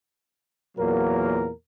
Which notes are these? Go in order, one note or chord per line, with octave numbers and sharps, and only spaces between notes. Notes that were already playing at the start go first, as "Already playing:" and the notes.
E2 A#2 F#3 A#3 A#4